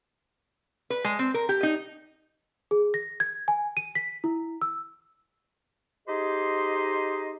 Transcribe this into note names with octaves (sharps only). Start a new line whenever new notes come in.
B4
G#3
C4
A#4
G4
D#4
G#4
A#6
G#6
G#5
D#7
B6
E4
E6
D#4 G4 G#4 C5 D#5